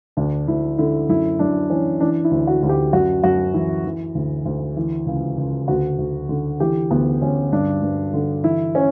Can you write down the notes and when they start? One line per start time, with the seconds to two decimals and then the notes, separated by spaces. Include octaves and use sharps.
0.17 D2 D4
0.48 D2 E4
0.78 D3 E4
1.09 F#2 E4
1.39 F#2 D4
1.70 E3 C#4
2.00 E3 D4
2.24 E4
2.31 D2
2.47 F#4
2.63 D2 F#4
2.69 G4
2.93 F#2 F#4
3.23 F#2 F#4
3.54 E3 E4
3.85 E3
4.15 D2
4.46 D2
4.77 E3
5.07 C#2
5.38 C#2
5.68 D2 F#4
5.99 D2
6.29 D3
6.60 E3 G4
6.91 D2 B3
7.21 D2 C#4
7.52 G2 D4
7.82 G2
8.14 D3
8.44 E3 E4
8.75 C#4